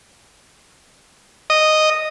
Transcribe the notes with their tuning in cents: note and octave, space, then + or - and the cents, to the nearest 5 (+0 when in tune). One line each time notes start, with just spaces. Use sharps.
D#5 -5